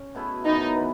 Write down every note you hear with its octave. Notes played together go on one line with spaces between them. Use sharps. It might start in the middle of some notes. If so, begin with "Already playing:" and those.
Already playing: C#4
B2 A3 E4 G#4
F#2 E3 B3 D#4
E3 B3